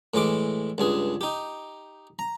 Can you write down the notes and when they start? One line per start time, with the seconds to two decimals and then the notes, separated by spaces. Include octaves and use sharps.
0.14 A2 E3 G#3 D6
0.78 C#2 G2 G#4
1.21 D#4 G4
2.19 A#5